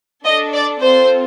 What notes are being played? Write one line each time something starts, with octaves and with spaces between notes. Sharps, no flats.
D4 A4 D#5
D5
C4 F4 A4 C5